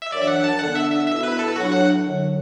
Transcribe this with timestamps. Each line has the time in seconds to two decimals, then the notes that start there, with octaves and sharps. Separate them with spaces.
0.02 E5
0.11 F#2 E3 D4 D5
0.21 E5
0.27 F#5
0.44 A5
0.59 D3 B3 D4 F#5
0.75 E5
0.91 E5
1.07 B2 B3 E4 E5
1.23 B4
1.39 A4
1.55 A2 F#3 D4 F#4
1.72 F#5
2.03 F#2 D3 F#3